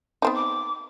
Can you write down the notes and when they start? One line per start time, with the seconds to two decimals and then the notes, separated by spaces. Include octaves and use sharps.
0.22 B3 C4 D#4
0.35 D6